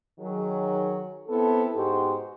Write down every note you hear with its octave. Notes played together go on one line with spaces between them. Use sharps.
D#3 F#3 G#4
B3 C4 E4 A4
G#2 B2 G#3 F#4 G4 C5